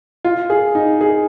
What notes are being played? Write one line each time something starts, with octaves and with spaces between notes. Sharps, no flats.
F4
G#4
D#4
G#4